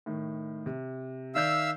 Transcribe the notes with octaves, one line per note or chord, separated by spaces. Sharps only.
A2 D#3
C3
D#3 D5 E5 F5 E6 G6